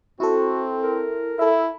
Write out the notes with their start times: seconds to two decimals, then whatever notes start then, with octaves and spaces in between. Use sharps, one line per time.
0.20 C4 E4 F#4 A4
0.83 A#4
1.39 E4 A4 E5